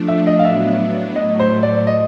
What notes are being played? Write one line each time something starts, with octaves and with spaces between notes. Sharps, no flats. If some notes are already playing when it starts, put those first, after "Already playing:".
Already playing: F3 A3 D4
E5
D#5
F5
A2 F#3 B3 D4 E5
A2 F#3 A3 D#5
C5
D5
D#5